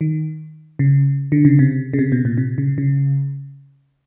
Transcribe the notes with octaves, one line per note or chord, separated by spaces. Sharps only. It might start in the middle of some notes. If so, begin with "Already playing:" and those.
D#3
C#3
D3
C#3
C3
C#3
C3
B2
A#2
C3
C#3
C#3